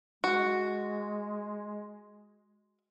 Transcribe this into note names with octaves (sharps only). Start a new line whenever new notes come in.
G#3 F#4